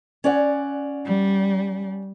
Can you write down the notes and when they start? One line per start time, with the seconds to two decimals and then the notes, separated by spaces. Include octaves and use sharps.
0.24 C#4 D5 F#5
1.05 G3